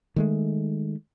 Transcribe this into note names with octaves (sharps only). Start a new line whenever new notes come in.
D#3 G#3 A3